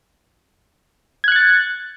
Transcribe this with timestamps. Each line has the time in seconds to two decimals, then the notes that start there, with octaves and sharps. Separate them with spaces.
1.24 G#6
1.28 F#6
1.32 C#7
1.36 A6